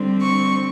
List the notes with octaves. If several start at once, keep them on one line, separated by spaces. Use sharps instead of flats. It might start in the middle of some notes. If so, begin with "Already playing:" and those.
Already playing: D3 G3 C4
C#6